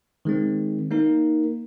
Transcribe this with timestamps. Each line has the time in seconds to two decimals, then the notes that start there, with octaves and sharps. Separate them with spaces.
0.25 D#3 G#3 C4
0.91 A#3 D#4 A#4